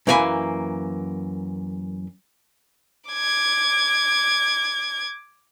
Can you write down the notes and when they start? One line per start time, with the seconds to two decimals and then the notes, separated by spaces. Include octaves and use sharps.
0.07 F#2 E3 A#3 C4 G#5 B5
3.10 D6 G#6